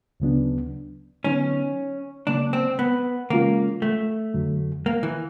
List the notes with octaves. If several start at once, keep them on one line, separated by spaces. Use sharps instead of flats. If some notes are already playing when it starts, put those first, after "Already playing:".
D2 C#3 F#3 B3 D4
D3 F#3 B3 C#4 D#4
C#3 F#3 A#3 D4
C4
B3
C#3 E3 G#3 A#3 C#4 F4
A3
F2 D3 F#3
A#3
E3